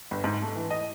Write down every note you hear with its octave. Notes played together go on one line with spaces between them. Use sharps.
G1
G#2
A3
E3
D#5